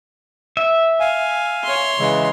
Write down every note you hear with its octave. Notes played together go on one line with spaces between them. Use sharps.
E5
F5 G#5
C#5 C6
C#3 E3 G#3